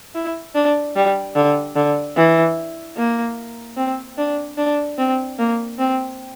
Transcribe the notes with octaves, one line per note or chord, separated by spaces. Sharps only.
E4
D4
G3
D3
D3
E3
A#3
C4
D4
D4
C4
A#3
C4